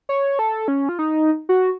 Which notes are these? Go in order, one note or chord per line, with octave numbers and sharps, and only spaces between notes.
C#5
A4
C#4
F4
D#4
F#4